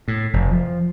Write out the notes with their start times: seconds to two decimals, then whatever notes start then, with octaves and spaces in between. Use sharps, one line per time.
0.08 A2
0.33 F1
0.51 F3